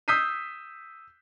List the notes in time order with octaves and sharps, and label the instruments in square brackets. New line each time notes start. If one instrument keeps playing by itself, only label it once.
[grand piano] D#6 E6 G6 B6 C7 D#7